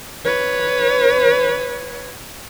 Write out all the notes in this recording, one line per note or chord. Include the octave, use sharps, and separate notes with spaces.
B4 C#5